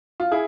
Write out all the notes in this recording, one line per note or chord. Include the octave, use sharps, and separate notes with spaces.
F4
E4 G#4